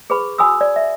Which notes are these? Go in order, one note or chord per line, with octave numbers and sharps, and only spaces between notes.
G#4 B4 B5 C#6
F#4 G#5 B5 D#6 E6
D5
E5